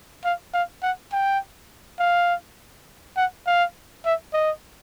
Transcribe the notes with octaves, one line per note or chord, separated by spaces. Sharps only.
F5
F5
F#5
G5
F5
F#5
F5
E5
D#5